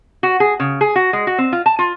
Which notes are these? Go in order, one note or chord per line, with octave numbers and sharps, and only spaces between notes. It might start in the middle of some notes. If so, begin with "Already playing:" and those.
F#4
G#4
C#3
G#4
F#4
G#3
F#4
C4
F4
A5
F4